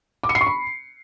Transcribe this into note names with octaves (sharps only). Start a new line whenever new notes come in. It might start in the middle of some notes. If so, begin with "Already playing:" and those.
D6
C#7
C7
C#6
B5